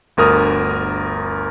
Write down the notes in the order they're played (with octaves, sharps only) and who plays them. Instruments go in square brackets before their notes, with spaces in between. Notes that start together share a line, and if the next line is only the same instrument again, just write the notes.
[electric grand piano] G1 D2 A#4 D#6 F6